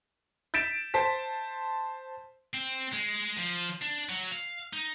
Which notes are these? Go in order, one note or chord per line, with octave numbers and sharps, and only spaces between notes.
G6 A6 B6 D7 E7
C5 A5 B6
C4
G#3
F3
D4
F#3
F5
D#4